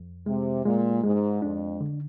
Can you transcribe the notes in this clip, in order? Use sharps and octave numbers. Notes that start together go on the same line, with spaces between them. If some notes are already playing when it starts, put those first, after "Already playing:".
Already playing: F2
C3 G#3
A#2 G#3
G#2 G#3
F2 D4
D3